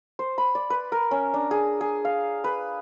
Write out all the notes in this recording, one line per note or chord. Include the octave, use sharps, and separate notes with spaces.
C5
B5
D5
B4
A#4
C#4
D4
G#4
G#4
F5
B4